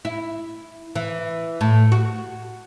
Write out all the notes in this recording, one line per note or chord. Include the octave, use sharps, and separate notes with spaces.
E4
E3
A2
F#4